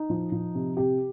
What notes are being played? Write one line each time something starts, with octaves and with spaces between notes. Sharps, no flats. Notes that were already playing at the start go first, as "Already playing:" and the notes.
Already playing: D#4
F3
F3
C3
C3 G4